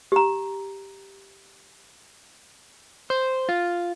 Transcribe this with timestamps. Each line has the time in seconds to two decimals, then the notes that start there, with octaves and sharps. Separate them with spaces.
0.12 G4 A#5
3.10 C5
3.49 F4